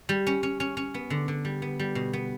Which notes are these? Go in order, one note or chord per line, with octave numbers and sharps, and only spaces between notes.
G3
C#4
C#4
C#4
C#4
B3
D3
D3
G3
B3
G3
B2
B3